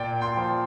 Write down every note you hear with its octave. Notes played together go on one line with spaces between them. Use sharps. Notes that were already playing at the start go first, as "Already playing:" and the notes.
Already playing: A#2 D5 G5
G5 C6
F3